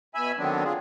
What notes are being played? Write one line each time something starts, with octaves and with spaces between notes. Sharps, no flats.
B2 E5 G#5 B5 E6
D3 D#3 F#3 B3 C4 D4
F4 G#4